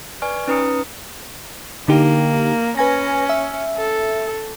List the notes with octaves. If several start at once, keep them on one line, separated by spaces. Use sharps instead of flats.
B4 D5 G#5 C#6 F6
C#4 D#4 B4 A#5 D#6 C#7
D3 A#3 D#4 G4
C#4 B4 G#5 A#6
E5
A4